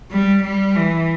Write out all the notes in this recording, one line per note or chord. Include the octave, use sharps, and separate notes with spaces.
G3
G3
E3